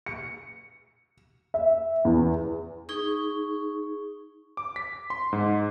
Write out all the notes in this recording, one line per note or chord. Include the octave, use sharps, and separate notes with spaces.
C#7
E5
E2
D#4 G#4 C#6
D6
B6
C6
G#2